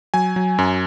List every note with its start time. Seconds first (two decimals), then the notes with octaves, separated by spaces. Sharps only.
0.14 F#3 G#5
0.36 F#3
0.58 F#2